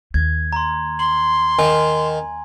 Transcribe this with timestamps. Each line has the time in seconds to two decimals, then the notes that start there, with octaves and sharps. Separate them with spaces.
0.14 D#2 G#6
0.53 A#5 C6
0.99 C6 F#7
1.59 D#3 G#5